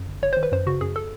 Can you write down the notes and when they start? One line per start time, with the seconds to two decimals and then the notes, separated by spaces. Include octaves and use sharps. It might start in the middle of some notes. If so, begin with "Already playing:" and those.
Already playing: F#2
0.08 G1
0.23 G1 C#5
0.33 D#3 C5
0.43 B4
0.52 F#2 C5
0.67 C#3 F#4
0.81 F#2 G#4
0.96 A4